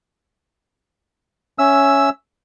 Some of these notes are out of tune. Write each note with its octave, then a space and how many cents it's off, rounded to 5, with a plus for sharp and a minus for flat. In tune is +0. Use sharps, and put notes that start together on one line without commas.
C#4 +5 E5 +10 E6 +0